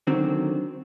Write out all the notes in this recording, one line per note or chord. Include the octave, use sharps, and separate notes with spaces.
D3 D#3 F#3 C4